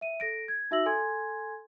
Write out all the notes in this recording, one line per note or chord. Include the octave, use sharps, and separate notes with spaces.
E5 D#7
A4 A#6 D7
G#6
D#4 F#4 E5 E6 A#6 F#7
A4 G#5 C6 G#6